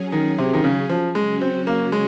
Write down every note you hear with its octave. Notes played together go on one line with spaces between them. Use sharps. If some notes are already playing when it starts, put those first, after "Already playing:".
Already playing: F#3 C#4 G#4
D#3
C3
D#3
C#3
F3
C#3 F#3 G#3 C#4 F#4
C4
A#3
G#3